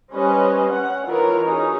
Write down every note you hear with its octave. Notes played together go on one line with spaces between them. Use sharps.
G3 C#4 B4 C5 D#5
C#4 F#5
E3 D#4 F4 A#4 B4 C#5
C#4 D#4 F#4 G#4